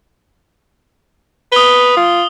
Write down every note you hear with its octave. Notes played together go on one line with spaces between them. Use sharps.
B4 D#6 F7 G7
F4